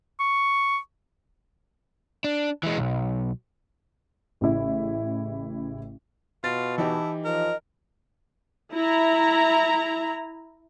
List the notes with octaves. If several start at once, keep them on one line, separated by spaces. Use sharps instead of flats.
C#6
D4
E3 G#3
B1
A1 C#3 E4
B2 F4 A6
E3 D#4 E4 G4 A5
F3 A#4 D#5
E4 A#5